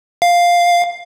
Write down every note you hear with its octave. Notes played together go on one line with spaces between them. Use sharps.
F5